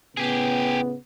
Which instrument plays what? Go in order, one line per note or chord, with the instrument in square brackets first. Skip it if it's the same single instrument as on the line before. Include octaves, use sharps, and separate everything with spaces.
[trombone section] A2 C#3 B3 [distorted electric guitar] G4 G#4